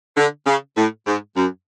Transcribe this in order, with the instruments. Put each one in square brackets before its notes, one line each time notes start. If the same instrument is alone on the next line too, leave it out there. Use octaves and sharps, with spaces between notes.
[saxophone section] D3
C#3
A2
G#2
F#2